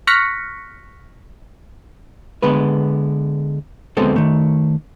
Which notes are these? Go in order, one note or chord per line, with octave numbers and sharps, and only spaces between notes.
C#6 F6 F#6 A#6 B6 C#7
D3 G#3 B3 B4
D2 G#3 B3 C4 A4 C5
D#3 A3